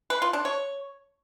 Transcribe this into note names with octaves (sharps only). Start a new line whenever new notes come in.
B4
F4
D4
C#5